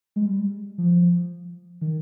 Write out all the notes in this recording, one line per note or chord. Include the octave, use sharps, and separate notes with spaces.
G#3
G3
F3
D#3